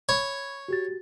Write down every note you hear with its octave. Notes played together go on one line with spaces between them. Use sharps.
C#5 B5
F#4 G4 A6